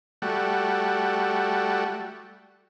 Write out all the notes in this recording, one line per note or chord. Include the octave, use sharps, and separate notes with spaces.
G3 A3 F#4